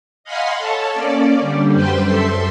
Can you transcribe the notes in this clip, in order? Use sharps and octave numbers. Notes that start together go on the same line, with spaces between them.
D#5 F5 F#5 G#5 B5 C6
A4 C#5 A5
A#3 C#4 D5
D3 G3
F#2 G3 B4 C5 G5 C6
F#2 A4 E5 C6